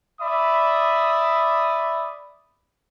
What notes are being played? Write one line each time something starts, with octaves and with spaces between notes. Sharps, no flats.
D5 E5 B5 D#6